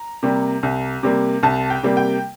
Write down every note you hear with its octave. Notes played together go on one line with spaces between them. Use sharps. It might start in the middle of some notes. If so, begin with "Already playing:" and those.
Already playing: A#5
C3 G3 A#3
C2
C3 G3 A#3
C2 A5
G5
C3 G3 A#3
G5